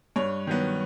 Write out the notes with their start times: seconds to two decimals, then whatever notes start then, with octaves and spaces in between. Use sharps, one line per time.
0.16 G2 C#5
0.47 D#3 F#3 B3